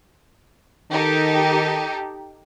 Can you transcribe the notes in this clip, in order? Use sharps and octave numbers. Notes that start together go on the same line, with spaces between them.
D#3 D#4 G4 A4